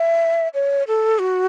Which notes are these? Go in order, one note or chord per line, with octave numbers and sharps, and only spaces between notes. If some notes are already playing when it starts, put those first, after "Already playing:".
Already playing: E5
C#5
A4
F#4